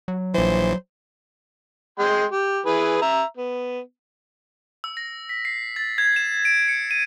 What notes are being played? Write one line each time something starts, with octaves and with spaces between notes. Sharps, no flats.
F#3
A#1 E3 C5
G#3 G5 C6
G4
E3 G#4 B4
E5 A#5
B3
E6
A#6
B6
C7
A6
G#6
E7
D7
C#7
D#7